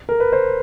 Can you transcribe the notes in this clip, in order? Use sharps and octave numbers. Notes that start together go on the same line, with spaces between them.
A#4
B4
C5